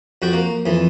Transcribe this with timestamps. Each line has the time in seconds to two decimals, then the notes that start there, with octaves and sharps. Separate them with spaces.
0.22 F2 F#4 G5
0.33 A#3
0.66 F2 E3